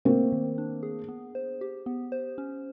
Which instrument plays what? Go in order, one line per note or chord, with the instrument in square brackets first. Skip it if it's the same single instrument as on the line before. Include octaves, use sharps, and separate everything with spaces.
[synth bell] A3 [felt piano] A#3 C4
[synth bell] D#3
D4
G#4
B3
C5
G4
B3
C5
C#4